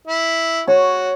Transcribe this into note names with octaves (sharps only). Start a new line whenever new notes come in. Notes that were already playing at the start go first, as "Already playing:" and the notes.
E4
F#4 C#5